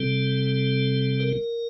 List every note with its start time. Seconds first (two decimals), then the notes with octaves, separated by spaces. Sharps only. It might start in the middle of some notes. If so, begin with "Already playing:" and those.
Already playing: C3 G3 C4 A4
1.20 A#4